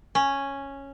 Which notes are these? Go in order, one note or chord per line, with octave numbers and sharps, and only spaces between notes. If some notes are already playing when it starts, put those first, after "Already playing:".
C#4